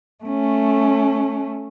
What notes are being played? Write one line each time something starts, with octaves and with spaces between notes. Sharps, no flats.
A3 C#4